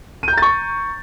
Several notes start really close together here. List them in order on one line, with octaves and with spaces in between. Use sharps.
D#7 G6 A#5 A6 C#6